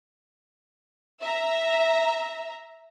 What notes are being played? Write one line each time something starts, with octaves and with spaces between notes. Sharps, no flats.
E5 A#5